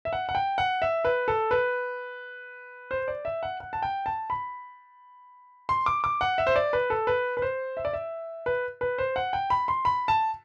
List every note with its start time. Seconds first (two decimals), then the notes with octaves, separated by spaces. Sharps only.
0.05 E5
0.13 F#5
0.29 F#5
0.35 G5
0.58 F#5
0.82 E5
1.05 B4
1.28 A4
1.51 B4
2.91 C5
3.08 D5
3.25 E5
3.43 F#5
3.60 F#5
3.73 A5
3.82 G5
4.06 A5
4.30 B5
5.69 C6
5.86 D6
6.04 D6
6.21 F#5
6.38 E5
6.47 C5
6.56 D5
6.73 B4
6.90 A4
7.07 B4
7.37 B4
7.42 C5
7.77 E5
7.85 D5
7.93 E5
8.46 B4
8.81 B4
8.98 C5
9.16 F#5
9.33 G5
9.50 B5
9.68 C6
9.85 B5
10.08 A5